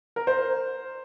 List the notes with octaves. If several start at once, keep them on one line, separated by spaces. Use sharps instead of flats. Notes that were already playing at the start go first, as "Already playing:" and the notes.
A#4
C5